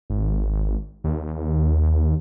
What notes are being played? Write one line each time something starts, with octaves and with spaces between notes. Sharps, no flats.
G#1
D#2